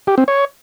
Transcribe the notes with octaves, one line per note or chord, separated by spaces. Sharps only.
G4
C4
C#5